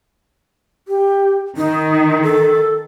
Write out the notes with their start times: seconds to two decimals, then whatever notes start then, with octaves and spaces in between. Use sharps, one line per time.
0.88 G4
1.57 D#3 D#4
2.23 A4